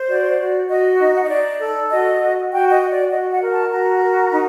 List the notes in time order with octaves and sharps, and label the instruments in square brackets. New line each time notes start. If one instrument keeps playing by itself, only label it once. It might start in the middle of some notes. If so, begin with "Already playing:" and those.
Already playing: [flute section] C5
F#4 D5
F#4
F#4 D#5
D#4
F#5
D#5
D#4 D5
A4
F#4 D#5
F#4
F#4 G5
D#5
F#4
D5
F#4 D#5
F#5
A#4
A5
F#4 A#5
A#4
D#4